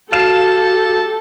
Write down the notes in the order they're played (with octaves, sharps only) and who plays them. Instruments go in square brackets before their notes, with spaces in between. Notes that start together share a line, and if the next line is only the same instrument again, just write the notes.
[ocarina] F#4 [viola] G4 A4 [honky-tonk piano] F5 E7 [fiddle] A5